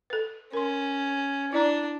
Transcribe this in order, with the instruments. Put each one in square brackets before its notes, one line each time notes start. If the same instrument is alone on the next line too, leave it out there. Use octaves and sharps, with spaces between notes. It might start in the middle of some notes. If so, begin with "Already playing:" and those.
[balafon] A4 B4
[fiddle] C#4 [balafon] A#4 C6
[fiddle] D4 [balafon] E4 D5 A#5